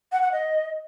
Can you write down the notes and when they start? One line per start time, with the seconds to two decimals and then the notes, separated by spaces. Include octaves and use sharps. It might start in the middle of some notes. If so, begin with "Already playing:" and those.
0.12 F#5
0.22 F#5
0.32 D#5